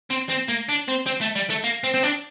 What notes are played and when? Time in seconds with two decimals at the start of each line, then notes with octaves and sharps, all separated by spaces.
0.11 C4
0.30 C4
0.49 A#3
0.69 D4
0.88 C4
1.07 C4
1.21 A3
1.36 G3
1.50 A3
1.64 A#3
1.84 C4
1.94 C4
2.03 D4